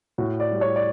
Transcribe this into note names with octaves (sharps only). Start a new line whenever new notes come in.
A2 F#4
D5
G3
C#5
D5